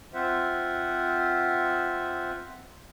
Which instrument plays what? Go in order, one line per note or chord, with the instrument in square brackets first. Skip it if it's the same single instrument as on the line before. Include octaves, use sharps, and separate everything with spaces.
[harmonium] C4 F4 C5 E5 F#5